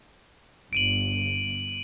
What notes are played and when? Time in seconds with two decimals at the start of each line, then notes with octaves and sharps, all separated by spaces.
0.73 G1 D7 D#7 F#7